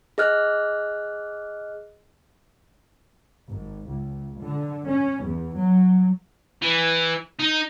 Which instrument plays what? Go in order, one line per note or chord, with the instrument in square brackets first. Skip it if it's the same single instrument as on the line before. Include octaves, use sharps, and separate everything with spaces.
[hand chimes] G#4 D#5 F6 F#6
[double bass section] G#1
C#2
D3
C#4
E2
F#3
[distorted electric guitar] E3
D#4